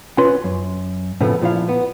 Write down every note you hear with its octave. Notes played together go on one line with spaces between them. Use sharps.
C#4 F4 B4 C6
F#2
A2 C#3 F3 A3 B3
A#2 F3 E4 F5
B3